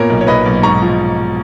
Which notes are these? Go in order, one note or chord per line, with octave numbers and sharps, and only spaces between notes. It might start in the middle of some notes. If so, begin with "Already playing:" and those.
Already playing: A#2 B3 A#4 C#5
B1
C#5
B1 B4 D#5
B1
G#2 A#5 C#6
F3